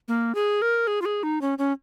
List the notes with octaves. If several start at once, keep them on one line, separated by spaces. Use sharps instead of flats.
A#3
G#4
A#4
G#4
F4
G#4
D#4
C#4
C#4